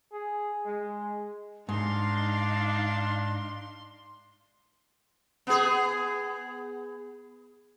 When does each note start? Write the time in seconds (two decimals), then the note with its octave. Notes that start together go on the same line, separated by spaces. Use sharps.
0.12 G#4
0.66 G#3
1.69 G#2 D4 D#4 F5 C6
5.47 B3 G#4